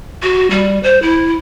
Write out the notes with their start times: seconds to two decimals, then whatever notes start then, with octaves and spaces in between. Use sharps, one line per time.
0.23 F#4
0.50 G3
0.83 C5
1.02 E4